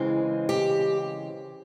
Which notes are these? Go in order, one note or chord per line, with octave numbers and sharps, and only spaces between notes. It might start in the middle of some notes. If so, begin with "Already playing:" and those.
Already playing: C#3 E3 G#3 C4
G4